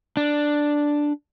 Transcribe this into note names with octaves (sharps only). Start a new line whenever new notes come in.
D4